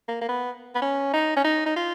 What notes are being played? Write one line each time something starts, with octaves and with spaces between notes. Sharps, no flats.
A#3
A#3
B3
B3
C#4
D#4
C#4
D#4
D#4
F4